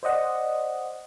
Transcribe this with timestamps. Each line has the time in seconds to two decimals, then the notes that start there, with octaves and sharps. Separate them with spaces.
0.03 C5 D5 D#5 F#5